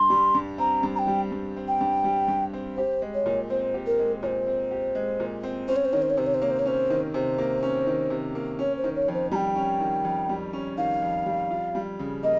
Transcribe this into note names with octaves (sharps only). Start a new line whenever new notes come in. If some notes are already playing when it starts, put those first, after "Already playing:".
Already playing: G2 C6
G3
G2
C4 A#5
G2
A#5
G5
G3
G2
C4
G5
G2
G3
G2
C4
G4 C5
G#3
C#5
A#2
C4 C5
G4
A#4
G#3
A#2 C5 C#5
C4
G4
G#3
A#2
C4
C#4 C5
C#5
C5
D#3 C#5
C5
C#5
C3 C5
C#5
C5
A#3 C#5
C5
C#5
C#4 C5
D#3
C3 C5
A#3
C#4
D#3
C3
A#3
C#4 C#5
C5
D#3
C#5
F2
C5
G3 G5 A#5
C#4
D#3
F2
G3
C#4
D#3 F5
F2
G3
F4
G3
C#3
A#3 D#5